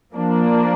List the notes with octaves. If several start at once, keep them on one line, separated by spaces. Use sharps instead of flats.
F3 A#3 D4